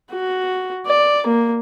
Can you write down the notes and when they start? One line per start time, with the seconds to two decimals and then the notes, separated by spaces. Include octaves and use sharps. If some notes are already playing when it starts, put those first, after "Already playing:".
0.10 F#4
0.86 D5
1.27 A#3